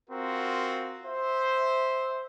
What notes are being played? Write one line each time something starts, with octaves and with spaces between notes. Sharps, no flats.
C4 F4 F#4 A#4
C5 E5